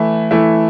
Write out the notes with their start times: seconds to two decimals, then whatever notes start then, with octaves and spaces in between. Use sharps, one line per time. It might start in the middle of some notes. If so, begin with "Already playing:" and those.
Already playing: E3 A3 E4
0.31 E3 A3 E4